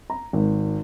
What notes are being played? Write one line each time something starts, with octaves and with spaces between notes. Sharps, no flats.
A#5
G#1